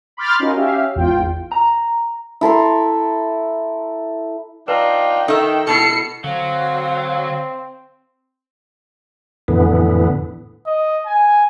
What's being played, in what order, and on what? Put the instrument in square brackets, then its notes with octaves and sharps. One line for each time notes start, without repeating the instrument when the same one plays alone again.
[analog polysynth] B5 C6 D6 F6 G6 A6
C#4 D#4 F4 F#4 A#4 D#5
C#4 G4 E5 F5
G#1 E2 F4 G5
[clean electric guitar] A#5
[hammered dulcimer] E4 A4 A#5 C6
[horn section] D4 D#4 F4 [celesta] B4 [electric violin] G5
[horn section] D#3 [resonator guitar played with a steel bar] D#4 E5 [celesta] A4
[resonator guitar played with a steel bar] B2 B3 E4 [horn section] A5 [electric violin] C7 C#7
[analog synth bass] D3 [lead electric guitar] F#3 [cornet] C4 [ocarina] F5
[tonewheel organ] F2 A2 D3 E3 B3
[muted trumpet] D#5
G#5